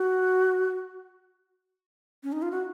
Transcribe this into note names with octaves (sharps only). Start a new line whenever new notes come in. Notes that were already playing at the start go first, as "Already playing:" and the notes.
Already playing: F#4
C#4
D#4
F4
F#4